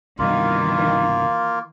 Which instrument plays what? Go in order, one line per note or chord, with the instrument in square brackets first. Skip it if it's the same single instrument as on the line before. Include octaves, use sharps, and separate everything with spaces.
[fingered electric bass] C2 G2 B2 [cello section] D#3 E3 [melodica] A#3 F4